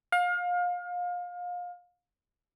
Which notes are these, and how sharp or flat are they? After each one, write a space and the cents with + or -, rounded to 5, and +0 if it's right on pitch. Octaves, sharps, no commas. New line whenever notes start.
F5 +30